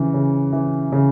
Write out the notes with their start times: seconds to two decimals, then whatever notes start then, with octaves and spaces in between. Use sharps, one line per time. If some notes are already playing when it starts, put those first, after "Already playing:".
Already playing: C#3 E3
0.14 C#3
0.53 E3
0.92 C#3